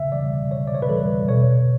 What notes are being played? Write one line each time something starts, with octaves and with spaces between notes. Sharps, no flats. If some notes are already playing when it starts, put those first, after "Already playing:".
Already playing: C#3 E5
E3 G3 D5
C#3 C#5
D5
C#5
B4
E3 G3 A4
B2 C#5